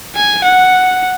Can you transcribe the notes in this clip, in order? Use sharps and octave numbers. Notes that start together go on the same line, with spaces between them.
G#5
F#5